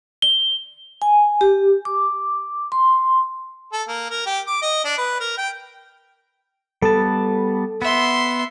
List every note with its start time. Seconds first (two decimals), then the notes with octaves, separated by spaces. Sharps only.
0.22 G7
1.02 G#5
1.41 G4
1.85 D6
2.72 C6
3.73 A4
3.88 A#3
4.10 A#4
4.26 G4
4.47 D6
4.62 D#5
4.85 D4
4.98 B4
5.20 A#4
5.38 G5
6.82 G3 B3 A4 A5
7.82 B3 E5 C6